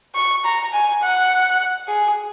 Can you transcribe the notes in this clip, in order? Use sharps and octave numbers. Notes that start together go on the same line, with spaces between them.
C#6
A#5
G#5
F#5
G#4